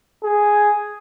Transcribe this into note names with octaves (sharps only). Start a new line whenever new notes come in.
G#4